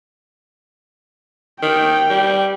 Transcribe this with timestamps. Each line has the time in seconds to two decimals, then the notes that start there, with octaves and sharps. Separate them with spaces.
1.62 D#3 G5
2.10 G3